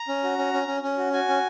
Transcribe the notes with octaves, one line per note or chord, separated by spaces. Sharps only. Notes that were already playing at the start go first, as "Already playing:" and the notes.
Already playing: A#5
C#4
F#4
C#4
C#4
C#4
C#4
F#4
F#4 G#5
C#4